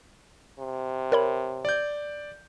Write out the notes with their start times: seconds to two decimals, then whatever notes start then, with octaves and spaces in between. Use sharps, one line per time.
0.59 C3
1.12 A#4 C#5 B5
1.65 D5 G6